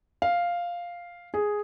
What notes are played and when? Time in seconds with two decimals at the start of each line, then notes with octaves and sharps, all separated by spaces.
0.22 F5
1.34 G#4